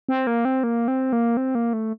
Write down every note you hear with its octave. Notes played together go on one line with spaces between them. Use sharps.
C4
A#3
C4
A#3
C4
A#3
C4
A#3
A3